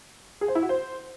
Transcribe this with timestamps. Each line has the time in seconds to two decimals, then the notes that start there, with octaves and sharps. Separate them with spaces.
0.41 G#4
0.48 C5
0.55 E4
0.62 F#4
0.69 C5